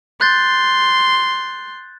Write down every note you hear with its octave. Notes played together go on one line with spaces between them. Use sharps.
C6 F#6 G6 A6